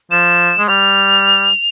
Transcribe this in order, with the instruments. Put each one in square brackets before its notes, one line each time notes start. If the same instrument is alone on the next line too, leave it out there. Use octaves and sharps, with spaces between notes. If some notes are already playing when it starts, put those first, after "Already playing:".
[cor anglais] F3 [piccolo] E7
[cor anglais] G#3
[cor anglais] G3 [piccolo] F7